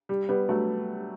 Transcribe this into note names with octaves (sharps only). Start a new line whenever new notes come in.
G3
G3 B3
F#3 A3